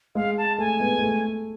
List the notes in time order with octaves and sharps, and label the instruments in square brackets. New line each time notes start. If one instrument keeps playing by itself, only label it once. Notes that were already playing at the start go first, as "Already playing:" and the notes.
[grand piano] G#3 [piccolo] F5
[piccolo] A5
[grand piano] A3 [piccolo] G#5
[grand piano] G#3 B3
G#3
A3